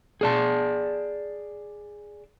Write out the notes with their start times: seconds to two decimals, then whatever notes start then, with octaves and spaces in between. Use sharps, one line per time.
0.21 G#4 D5 A5